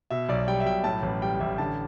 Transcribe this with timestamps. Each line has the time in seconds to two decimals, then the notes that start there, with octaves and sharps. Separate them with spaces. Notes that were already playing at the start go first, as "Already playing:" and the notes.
0.10 B2 E5
0.29 B1 D5
0.48 G3 G5
0.60 E5
0.65 B1 G5
0.84 A2 A5
1.02 A1
1.22 G3 G5
1.40 A1 E5
1.58 D3 A5